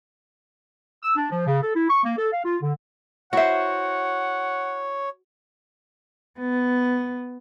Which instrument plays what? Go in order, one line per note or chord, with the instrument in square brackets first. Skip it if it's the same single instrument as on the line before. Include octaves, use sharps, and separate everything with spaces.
[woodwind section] E6
D4
F3
C#3
A4
E4
C#6
A#3
A4
F5
F4
D3
[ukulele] E4 E5 [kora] F#4 C5 [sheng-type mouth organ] C#5 [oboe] F#5
[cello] B3